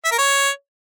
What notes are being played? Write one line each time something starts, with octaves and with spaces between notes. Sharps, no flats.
E5
A#4
C#5